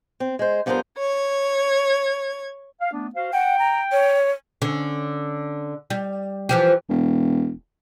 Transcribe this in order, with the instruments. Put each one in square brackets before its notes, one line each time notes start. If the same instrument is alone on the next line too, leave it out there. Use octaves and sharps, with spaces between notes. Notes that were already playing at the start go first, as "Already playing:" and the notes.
[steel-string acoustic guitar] C4
G#3 C5
G2 F3 B3 F#4 A#4 C5
[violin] C#5 G#6
[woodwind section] F5
A3 B3 D4
F#4 C5 F5
[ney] F#5 [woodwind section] G5
[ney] A#5
C#5
[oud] D3 C#4
G3
E3 F3 G4
[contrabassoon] E1